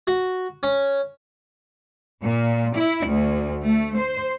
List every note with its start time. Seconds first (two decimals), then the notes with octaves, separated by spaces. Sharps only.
0.07 F#4
0.63 C#4
2.22 A#2
2.76 E4
3.06 D2
3.63 A3
3.98 C5